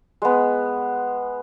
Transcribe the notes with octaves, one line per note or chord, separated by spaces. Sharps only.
G#3 B3